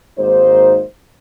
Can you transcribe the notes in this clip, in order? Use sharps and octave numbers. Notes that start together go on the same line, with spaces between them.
G#1 G#2 A#3 D#4 C5